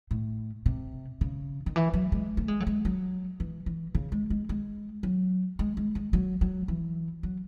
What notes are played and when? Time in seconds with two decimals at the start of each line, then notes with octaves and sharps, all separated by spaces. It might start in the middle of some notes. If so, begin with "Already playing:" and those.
0.11 A2
0.66 C3
1.21 C#3
1.66 D#3
1.76 E3
1.94 F#3
2.12 G#3
2.37 A3
2.48 G#3
2.60 F#3
2.67 G#3
2.85 F#3
3.40 E3
3.66 E3
3.95 C#3
4.12 G#3
4.30 G#3
4.49 G#3
5.03 F#3
5.59 G#3
5.77 G#3
5.95 G#3
6.13 F#3
6.41 F#3
6.68 E3
7.23 F#3